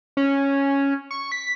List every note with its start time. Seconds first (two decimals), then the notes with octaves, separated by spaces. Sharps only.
0.17 C#4
1.11 C#6
1.32 B6